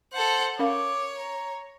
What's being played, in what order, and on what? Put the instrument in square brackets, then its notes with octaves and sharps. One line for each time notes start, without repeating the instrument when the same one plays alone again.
[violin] A4 F#5 [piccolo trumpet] C5
[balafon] C#4 A#4 F5 [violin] C#5 [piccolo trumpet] D6
[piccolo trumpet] A#5